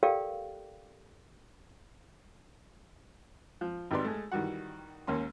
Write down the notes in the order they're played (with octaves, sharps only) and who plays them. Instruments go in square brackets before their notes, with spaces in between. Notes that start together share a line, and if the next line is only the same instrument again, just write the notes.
[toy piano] G4 A4 A#4 D5 F5 G5
[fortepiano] F3
G#1 D#4 G4 B4 D5 C6
G#3 A3
D#3 E3 G3 F#4 F#5
D#2 A#3 C#4 C6